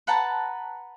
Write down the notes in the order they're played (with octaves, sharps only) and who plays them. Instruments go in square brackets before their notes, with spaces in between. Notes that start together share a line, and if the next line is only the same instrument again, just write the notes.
[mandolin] B4 F#5 A5 A#5